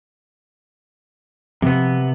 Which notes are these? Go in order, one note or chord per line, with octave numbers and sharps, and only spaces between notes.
C3 F3 B3